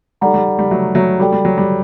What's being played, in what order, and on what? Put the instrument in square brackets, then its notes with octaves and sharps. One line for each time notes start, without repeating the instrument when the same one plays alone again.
[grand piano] G3 [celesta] D#4 A4 D5 F#5 A#5
[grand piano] G3
G3
F#3 A3
F#3 A3
[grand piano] G3 [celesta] F#4 A4 D5 G5
[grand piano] G3
F#3
G3